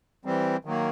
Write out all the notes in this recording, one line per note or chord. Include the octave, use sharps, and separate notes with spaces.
E3 G3 C4
D#3 F#3 A#3